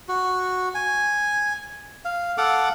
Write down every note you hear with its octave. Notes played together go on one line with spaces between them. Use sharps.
F#4
G#5
F5
A4 F5 F#5 D6